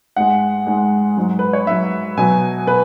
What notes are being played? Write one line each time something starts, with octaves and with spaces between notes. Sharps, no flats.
G#2 G#3 F#5
G#2 G#3
G#2 F#3
B4
C#5
G#2 F#3 E5
B2 F#3 G#5
B2 B4